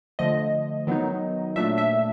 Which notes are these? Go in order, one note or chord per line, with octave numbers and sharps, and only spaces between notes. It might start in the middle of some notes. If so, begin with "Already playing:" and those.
D3 F3 A3 D#5
D#3 F#3 B3 D#4
A#2 F#3 A3 D4 E5
E5